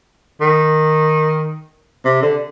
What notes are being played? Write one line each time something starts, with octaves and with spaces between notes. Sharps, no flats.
D#3
C3
D3